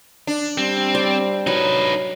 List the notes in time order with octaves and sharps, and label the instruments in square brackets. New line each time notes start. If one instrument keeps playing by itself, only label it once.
[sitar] D4
[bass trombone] G3 [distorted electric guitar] C4
[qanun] C5 D5
[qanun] F#3 [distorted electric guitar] D#4 B4